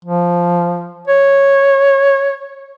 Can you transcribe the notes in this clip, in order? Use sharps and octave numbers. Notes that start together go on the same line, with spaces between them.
F3
C#5